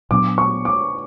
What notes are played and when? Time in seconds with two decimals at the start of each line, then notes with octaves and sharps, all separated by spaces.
0.11 A#2 F#3 B3 D4 D6
0.38 C#6
0.65 D6